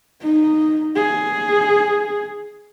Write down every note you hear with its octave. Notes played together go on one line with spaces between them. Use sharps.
D#4
G#4